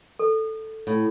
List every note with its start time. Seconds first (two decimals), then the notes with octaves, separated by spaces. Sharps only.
0.19 A4
0.87 A2